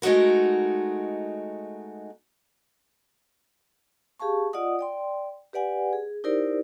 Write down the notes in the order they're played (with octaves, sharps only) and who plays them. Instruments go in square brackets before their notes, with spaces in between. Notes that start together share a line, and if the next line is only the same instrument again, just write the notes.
[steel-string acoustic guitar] G#3 A3 D#4 F#4 A#4
[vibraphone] G4 G#4 F5 A5 C#6
F4 D5 D#5 F#5 D#6
D5 G5 C6
G4 B4 D5 F#5 G#5
G#4
D#4 E4 G4 A#4 C5 D5